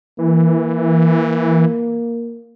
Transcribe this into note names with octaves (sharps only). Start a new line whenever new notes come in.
E3 A#3